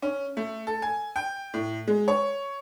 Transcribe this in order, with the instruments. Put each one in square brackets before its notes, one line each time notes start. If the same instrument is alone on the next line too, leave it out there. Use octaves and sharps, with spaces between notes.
[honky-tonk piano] C#4
A3
A4
G#5
G5
A2
G#3
C#5